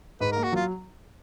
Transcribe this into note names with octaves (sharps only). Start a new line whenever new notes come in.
G#2 B4
A#4
A#3
F#4
F#3 F4